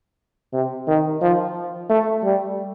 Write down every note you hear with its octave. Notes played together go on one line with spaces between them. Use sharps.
C3
D#3
F3
A3
G3